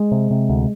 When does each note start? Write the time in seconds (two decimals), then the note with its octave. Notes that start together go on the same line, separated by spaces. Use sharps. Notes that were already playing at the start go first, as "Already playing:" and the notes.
Already playing: G#3
0.12 C3
0.31 C3
0.49 D2